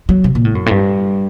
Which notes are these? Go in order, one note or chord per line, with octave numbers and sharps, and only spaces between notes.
F#3
C3
A#2
A2
F#2
A2
G2